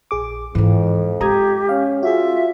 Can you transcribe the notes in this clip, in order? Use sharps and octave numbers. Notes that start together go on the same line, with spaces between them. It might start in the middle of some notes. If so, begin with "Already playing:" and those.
A#1 G#4 D6
F2 G#2 D#3 E3
G#3 G4 A#5 D#6 G#6
C#4 F5
F4 F#4 G#4 E5